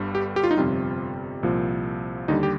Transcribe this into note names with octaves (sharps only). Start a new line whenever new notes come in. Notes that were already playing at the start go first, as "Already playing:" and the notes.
Already playing: G1 G2 D3 G3
G4
G4
F4
D#4
G1 F2 C3 G3 F4
C2 A#2 F3
D#2 D3 G3 D#4
G4